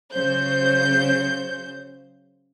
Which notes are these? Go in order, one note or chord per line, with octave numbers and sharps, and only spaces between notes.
C#3 F#3 C5 G6